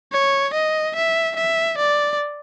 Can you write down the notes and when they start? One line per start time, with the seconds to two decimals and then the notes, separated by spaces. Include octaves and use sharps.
0.12 C#5
0.54 D#5
0.95 E5
1.36 E5
1.78 D5